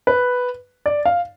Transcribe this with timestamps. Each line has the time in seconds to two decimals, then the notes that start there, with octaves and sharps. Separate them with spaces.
0.07 B4
0.86 D5
1.06 F5